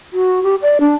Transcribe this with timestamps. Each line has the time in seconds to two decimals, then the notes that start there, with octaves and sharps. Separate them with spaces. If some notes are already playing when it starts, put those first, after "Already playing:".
0.13 F#4
0.43 G4
0.62 D5
0.80 D4